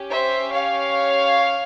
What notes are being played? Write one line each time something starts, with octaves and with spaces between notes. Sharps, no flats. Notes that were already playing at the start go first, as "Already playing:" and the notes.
Already playing: C#4 G4
C5 E5
C#5 F5